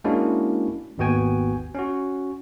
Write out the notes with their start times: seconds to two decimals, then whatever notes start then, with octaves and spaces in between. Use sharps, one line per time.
0.04 G#3 A#3 C#4 D4 E4 F#4
0.98 G#1 D#2 B3 F#4 G5 G#5
1.75 C#4 F#4